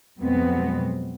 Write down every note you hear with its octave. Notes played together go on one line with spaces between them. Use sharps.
F2 B2 F#3 G#3 B3 C4